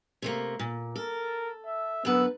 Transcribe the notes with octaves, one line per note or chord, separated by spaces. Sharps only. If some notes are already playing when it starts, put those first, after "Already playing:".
C3 A3 A#3
A#2
A4 A#4
E5
F#2 D3 B3 B4 E6